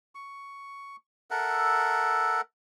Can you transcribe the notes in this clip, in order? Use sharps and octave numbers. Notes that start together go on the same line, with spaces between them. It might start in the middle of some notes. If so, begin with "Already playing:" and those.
C#6
A4 A#4 E5 F#5